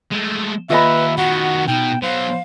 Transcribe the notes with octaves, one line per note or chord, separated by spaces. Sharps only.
G#3 A3
D#2 F4 B4 D#5 E5 B5
D#3 B3 F#4 F#5
B2 D#4 G5
B2 F#3 C5 F5